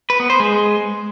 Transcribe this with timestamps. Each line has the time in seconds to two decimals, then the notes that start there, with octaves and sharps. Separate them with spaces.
0.10 B4
0.20 B3
0.30 C5
0.40 G#3